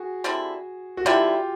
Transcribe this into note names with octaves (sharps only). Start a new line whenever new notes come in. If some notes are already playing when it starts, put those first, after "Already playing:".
Already playing: F#4 G#4
D3 G3 C4 E4
F#4
D3 G3 C4 E4 F4 G4